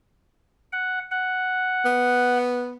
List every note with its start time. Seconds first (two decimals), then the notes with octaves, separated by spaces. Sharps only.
0.73 F#5
1.11 F#5
1.85 B3